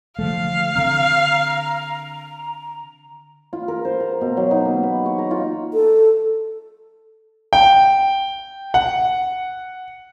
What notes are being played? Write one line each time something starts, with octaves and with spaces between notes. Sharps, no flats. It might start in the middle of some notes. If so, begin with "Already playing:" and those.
D3 F3 A3 F5
D3 C4 A#5
F4
A#4
C5
A#5
B2
F#3
D#4
A#3
B5
C#6
A#5
F4
A4
G5
F#5